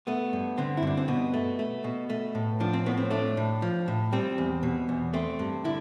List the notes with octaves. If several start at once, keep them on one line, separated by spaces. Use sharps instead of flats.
A3 B3
G2
D3 C4
E4
G2 D4
C4
B2 B3
A3
A3
B2
A3
A2
F3 D4
C4
A2 B3
C4
A3 D4
A2
F3
A2
G3 C4
E2
B2
E2
A3 C4
G2
D3 E4